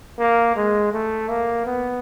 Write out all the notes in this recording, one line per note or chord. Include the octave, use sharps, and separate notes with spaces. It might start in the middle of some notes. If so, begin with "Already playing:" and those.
A#3
G#3
A3
A#3
B3